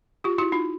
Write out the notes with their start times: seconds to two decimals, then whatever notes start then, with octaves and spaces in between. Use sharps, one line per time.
0.24 F4 G4
0.38 E4 F#4
0.52 D#4 F4